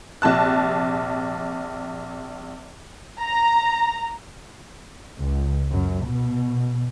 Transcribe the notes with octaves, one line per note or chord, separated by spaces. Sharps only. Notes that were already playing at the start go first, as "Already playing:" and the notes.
A#1 C3 A5 F#6
A#5
C#2
F#2
B2